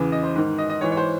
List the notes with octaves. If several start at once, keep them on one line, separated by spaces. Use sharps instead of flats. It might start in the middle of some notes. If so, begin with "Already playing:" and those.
Already playing: E2 C#3 E3
D#5
C5
G#2 D#3
D#5
D#5
G#2 E3 C#5
C#5
C5